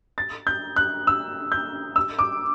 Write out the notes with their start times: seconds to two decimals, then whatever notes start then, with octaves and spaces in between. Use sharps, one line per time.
0.18 A6
0.47 G6
0.76 F#6
1.07 E6
1.52 G6
1.96 E6
2.19 D6